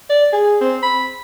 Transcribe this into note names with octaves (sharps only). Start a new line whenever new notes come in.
D5
G#4
C4
B5